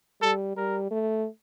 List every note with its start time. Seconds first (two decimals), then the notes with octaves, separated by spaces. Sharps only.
0.22 G3 A4
0.56 G3 A#4
0.91 A3